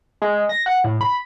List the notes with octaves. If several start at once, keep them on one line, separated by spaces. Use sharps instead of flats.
G#3
A#6
F#5
A2
B5